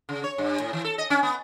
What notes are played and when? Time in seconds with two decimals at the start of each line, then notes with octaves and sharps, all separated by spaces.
0.09 C#3
0.24 C#5
0.38 G2
0.60 A2
0.73 E3
0.84 A4
0.98 D#5
1.10 C#4
1.23 B3